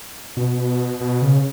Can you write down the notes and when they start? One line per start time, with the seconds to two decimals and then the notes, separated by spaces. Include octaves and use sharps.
0.37 B2
1.01 B2
1.22 C#3